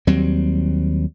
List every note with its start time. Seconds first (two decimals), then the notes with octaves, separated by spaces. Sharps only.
0.07 D#2 F#3 G3 C4